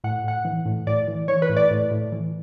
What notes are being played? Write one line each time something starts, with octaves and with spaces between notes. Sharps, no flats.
A2 F#5
A2 F#5
E3
A2
A2 D5
E3
E3 C#5
B4
A2
D5
A2
A2
E3